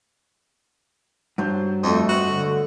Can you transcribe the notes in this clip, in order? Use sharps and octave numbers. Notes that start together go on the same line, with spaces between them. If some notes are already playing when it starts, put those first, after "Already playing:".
G2 F#3 C5 A5
F2 A3 A4 D#5
F#4 B4
D3 A3